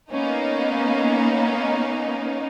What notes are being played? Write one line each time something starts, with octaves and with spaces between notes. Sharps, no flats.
A#3 B3 C#4 D#4